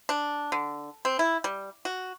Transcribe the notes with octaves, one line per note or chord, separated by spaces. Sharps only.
D4
D3
C4
E4
G3
F#4